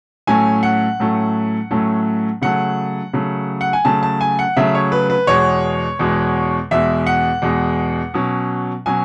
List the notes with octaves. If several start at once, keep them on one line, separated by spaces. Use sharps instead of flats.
A2 F#3 A3 C#4 G#5
F#5
A2 F#3 A3 C#4
A2 F#3 A3 C#4
C#3 F#3 A3 F#5
C#3 F#3 A3
F#5
G#5
C#3 F#3 A3 A5
A5
G#5
F#5
C#3 F#3 A3 E5
C#5
B4
B4
E2 B2 G#3 C#5
E2 B2 G#3
E2 B2 G#3 E5
F#5
E2 B2 G#3
B2 F#3 C#4
B2 F#3 C#4 G#5